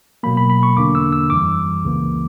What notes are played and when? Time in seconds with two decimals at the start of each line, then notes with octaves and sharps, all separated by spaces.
0.23 B2 F#3 A#3 B5
0.37 B5
0.50 B5
0.63 C#6
0.76 E2 D3 A#3 D4 D6
0.95 E6
1.12 E6
1.30 F#2 E3 G3 D6
1.83 C#2 C#3 E3 A#3